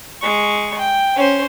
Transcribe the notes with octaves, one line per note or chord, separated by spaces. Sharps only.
G#3 C#6
G5
C#4 C5